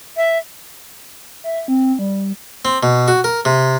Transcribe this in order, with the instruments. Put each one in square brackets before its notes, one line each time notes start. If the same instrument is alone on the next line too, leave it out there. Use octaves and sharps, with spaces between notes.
[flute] E5
[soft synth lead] E5
C4
G3
[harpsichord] C4
B2
F#4
A#4
C3